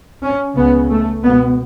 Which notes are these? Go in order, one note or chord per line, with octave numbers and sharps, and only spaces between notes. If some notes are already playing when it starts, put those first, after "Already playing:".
C#4
C#2 C#3 B3
A3
C#2 B2 B3